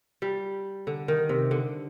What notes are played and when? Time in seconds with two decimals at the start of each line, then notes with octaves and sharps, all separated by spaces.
0.22 G3
0.87 D3
1.08 D#3
1.29 C3
1.51 D3